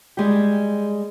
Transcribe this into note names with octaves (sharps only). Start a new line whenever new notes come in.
G3 G#3 G4